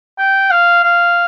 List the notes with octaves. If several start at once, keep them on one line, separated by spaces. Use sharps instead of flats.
G5
F5
F5